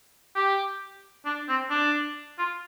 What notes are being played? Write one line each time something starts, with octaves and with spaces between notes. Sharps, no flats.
G4
D4
C4
D4
F4